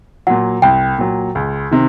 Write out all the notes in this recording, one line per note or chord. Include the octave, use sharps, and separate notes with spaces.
A#2 F#3 F#5
C2 G5
A#2 F#3
C#2
C3 D#3